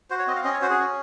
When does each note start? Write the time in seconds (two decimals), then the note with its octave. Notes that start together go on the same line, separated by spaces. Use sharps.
0.10 F#4 C5
0.19 C#5
0.27 C4 D#5
0.36 F5
0.44 C#4 D#5
0.53 C#5
0.62 F#4 C5
0.70 G#4
0.79 C#4